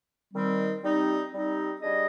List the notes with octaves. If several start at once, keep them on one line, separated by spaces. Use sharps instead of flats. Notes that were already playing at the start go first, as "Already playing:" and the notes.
D#3 G3 C4
G3 C4 D#4
G3 C4 D#4
G3 D4 G#4 D#5